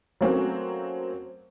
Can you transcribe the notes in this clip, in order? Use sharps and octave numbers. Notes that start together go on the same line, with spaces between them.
F#3 A3 A#3 C4 C#4 F#4